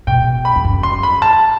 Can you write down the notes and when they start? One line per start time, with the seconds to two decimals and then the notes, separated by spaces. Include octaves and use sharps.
0.07 B2 G5
0.45 B5
0.56 E2
0.64 F#2
0.83 C6
1.03 B5
1.22 A5